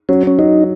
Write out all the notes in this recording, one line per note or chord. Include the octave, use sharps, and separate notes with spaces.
F#3 C#4
C#4
F#3 D#4